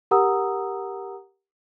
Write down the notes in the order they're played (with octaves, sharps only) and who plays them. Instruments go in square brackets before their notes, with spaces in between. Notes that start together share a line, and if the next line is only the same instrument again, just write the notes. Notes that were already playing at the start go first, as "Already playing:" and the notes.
[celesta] G4 A#4 F#5 A#5 D#6 E6